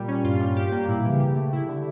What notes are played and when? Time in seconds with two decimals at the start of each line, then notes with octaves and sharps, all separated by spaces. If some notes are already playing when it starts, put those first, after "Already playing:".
Already playing: A#2 G3
0.08 C#4
0.24 G2 F4
0.40 G3
0.56 G4
0.72 A#3
0.88 A2 E4
0.99 A#2
1.05 C#3 E3
1.20 G4
1.36 A3
1.53 E4
1.68 D3